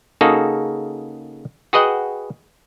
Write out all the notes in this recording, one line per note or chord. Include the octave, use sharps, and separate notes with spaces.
C#3 A#3 D#4 F#4 G#4 A4
F#4 G#4 B4 D#5 F#5 G5